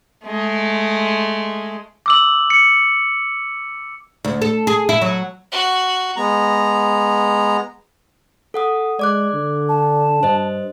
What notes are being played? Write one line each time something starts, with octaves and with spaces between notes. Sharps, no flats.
G#3 A3
D6 E6 F#7
C#7
D2
A4
G#4
E4
F#3
F#4
G#3 B3 A#5
A4 F#5 D#6
G#3 D5 D6 F#6
D3
A5
G2 C5 D#5